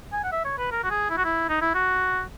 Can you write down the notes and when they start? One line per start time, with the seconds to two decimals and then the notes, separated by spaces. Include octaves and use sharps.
0.13 G#5
0.24 F#5
0.32 E5
0.45 C#5
0.58 B4
0.71 A#4
0.84 F#4
0.91 G#4
1.10 E4
1.17 F#4
1.25 E4
1.49 D#4
1.62 E4
1.75 F#4